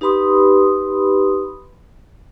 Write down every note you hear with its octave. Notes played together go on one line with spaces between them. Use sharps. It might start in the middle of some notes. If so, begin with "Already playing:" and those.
D#4 G4 B4 B5 C6 D#6